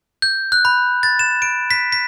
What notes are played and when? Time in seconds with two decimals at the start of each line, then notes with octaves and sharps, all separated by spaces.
0.22 G6
0.52 F#6
0.65 B5
1.03 A6
1.19 E7
1.42 D7
1.71 B6
1.92 B6